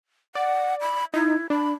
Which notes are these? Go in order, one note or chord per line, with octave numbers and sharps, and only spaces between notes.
D5 F#5
B5
D#4 E4
D4 B5